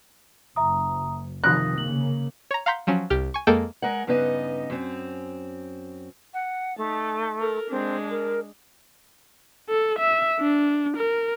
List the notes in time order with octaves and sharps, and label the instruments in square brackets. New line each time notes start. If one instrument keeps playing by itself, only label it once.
[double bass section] F#1 [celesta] E5 A#5 D#6
[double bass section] C3 D#3 F3 [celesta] D#6 A#6 [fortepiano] F#6
[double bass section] C#3 A#3 [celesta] F#7
[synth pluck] C#5 A#5
F5 F#5 A#5 C6 G6 B6
F3 F#3 C#4
C2 G4 F6
G#5 C#6
F2 G#3 A#3 A4 G5 D7
[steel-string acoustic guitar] G#3 A#4 F#5
G2 C#3 B3 D#4 F4 D#5
F#2 C4
[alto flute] F#5
[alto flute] A3 [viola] D#4 A5
[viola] A4 A#4
[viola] G#3 D4 [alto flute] C4
[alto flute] A#4
[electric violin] A4
E5
D4
A#4